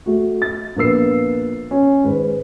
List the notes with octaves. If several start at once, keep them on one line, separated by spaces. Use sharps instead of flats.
A3 F#4
A6
A#1 A#3 B3 A#4 E6 C7
C#4
G#2 D#3 B4